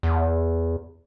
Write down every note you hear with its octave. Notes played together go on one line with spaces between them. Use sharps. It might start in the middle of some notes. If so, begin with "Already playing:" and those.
E2